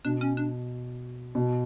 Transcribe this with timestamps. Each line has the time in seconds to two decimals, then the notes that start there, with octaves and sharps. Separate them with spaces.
0.05 B2 D4
0.21 C#4
0.37 D4
1.35 B2